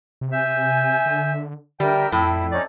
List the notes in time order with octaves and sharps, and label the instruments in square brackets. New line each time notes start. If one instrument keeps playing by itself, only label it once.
[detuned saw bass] C3
[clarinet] E5 [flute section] G#5 G6
[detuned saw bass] D3
[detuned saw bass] D3 [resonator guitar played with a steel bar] G3 [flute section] A#4 E5 [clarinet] G5
[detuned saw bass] F2 [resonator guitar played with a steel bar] A2 [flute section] E4
[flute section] C#4 D#4 [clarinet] D5